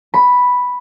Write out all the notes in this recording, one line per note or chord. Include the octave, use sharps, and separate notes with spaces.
B5